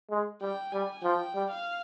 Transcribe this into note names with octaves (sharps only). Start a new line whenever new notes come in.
G#3
G3 G5
G3 G#5
F3 G5
G3
F5